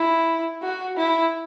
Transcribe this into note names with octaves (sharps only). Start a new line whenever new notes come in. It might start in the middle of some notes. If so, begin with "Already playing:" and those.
Already playing: E4
F#4
E4